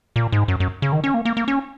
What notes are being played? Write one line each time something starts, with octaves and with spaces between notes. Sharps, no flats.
A#2
G#2
F#2
F#2
C#3
D#3
C#4
A#3
A#3
A#3
C#4